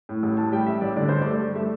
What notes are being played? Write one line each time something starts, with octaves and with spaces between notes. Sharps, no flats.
A2
A1
A2 A5
G3 G5
A1 E5
A1 D5
D3 D5
G2 C5
A3 D5
G2
A3 E5